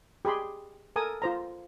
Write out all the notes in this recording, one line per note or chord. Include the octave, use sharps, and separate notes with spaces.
G4 G#4 B5 C6
A4 A#4 G#5 D#6
F4 C5 A#5